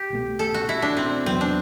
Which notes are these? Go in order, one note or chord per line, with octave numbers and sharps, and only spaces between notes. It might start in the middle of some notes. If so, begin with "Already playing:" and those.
Already playing: G4
C2 B2 A3
A4
F#4
E4
D4
C4
E2 C3 F#3 B3 C4
D4